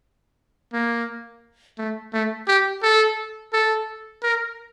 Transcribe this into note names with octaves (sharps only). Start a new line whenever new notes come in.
A#3
A3
A3
G4
A4
A4
A#4